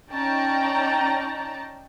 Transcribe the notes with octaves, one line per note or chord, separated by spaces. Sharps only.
C#4 D#4 D5 G5 A5 A#5